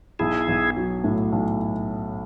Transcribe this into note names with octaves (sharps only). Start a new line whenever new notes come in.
B1 E4 G#4
B1
F#3
A2
B1